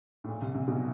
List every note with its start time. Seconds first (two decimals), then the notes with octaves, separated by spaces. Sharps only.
0.24 A2
0.29 A#2
0.41 C2 C3
0.54 C2 C3
0.68 B1 B2